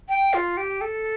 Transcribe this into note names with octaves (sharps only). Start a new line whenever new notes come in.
G5
F4
G4
A4